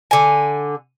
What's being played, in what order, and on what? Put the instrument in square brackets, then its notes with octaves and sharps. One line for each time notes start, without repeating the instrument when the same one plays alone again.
[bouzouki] D3 G#5